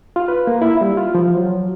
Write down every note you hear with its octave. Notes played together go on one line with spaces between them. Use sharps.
F4
B4
A#3
E4
G3
F4
F3
F#3